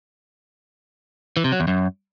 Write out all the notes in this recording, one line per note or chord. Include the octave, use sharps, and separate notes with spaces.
E3
C3
F#3
E2
F#2